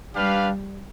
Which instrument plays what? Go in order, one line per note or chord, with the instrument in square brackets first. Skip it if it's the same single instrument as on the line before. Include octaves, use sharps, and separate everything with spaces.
[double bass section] G3 [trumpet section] D4 G4 B4 F5